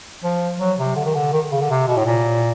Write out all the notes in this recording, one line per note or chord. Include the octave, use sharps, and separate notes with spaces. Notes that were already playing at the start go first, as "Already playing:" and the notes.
F3
F#3
C3
D3
D#3
D3
D#3
C#3
D3
C3
B2
A2
A#2